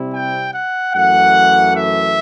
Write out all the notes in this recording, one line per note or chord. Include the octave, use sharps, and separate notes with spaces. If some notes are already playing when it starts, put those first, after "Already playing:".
Already playing: C3 G3 C4 E4
G5
F#5
F#2 E3 A3 F#5
E5